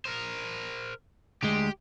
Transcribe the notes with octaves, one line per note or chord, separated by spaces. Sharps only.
A#4 C5
D2 G#3 G4